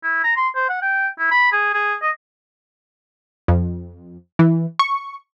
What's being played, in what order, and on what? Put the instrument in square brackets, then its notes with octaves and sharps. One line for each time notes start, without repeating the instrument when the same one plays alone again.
[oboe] E4
A#5
C6
C5
F#5
G5
E4
B5
G#4
G#4
D#5
[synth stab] F2
E3
C#6